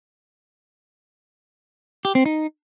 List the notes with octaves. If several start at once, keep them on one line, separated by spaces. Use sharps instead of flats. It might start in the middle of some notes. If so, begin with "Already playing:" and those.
G4
C4
D#4